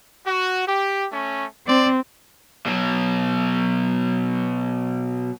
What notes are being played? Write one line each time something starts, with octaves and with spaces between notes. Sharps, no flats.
F#4
G4
A3 C#4
C4 C5 D5
B2 F#3